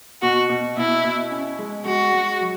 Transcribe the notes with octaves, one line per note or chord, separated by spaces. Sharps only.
B2 F#4
B2
B2 E4
B2
C#4
G#3
G#3 F#4
G#3
F#3